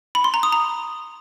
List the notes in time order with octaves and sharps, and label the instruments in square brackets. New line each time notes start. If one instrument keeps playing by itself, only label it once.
[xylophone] B5
C6
A#5
D#6
A#5